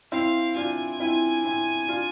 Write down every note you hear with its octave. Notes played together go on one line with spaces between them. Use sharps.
C4 E4 F5
D4 F4 G#5
C4 E4 G#5
C4 E4
D4 F4